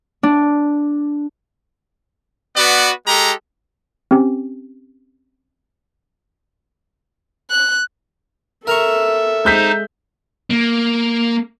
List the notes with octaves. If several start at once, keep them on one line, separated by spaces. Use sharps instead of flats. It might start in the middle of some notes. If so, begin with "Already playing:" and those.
D4
B3 F#4 B4 D5
G#3 G4 A4 A#5
C4 C#4 G4
F#6
A4 A#4 E5 A#5 C#6
G#3 D#4 C5 G6 B6
A#3